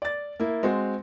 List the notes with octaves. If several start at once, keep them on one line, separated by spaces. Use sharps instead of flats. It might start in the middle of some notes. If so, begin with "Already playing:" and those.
D5 A6
A#3 E4
G#3 C4 F#4